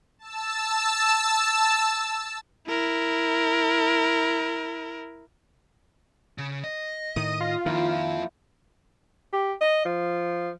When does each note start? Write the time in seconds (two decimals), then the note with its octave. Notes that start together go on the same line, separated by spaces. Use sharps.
0.19 A5 E6
2.67 E4 A#4
6.38 C#3
6.64 D#5
7.16 A2 D#3 D#6
7.41 F4
7.66 F2 D#3 F3 A#3 E4
9.33 G4
9.61 D#5
9.85 F3